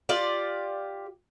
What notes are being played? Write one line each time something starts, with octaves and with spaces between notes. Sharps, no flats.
F4 G4 D5